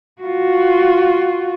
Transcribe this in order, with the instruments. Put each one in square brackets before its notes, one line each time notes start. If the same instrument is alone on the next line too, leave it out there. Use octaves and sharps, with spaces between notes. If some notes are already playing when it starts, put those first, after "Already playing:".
[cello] F4 F#4